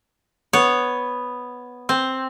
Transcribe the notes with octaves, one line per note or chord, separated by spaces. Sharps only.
B3 C#5
C4